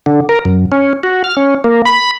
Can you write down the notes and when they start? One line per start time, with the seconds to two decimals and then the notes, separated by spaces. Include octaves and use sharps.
0.06 D3
0.29 A#4
0.45 F#2
0.72 C#4
1.03 F#4
1.24 F6
1.37 C#4
1.64 A#3
1.85 B5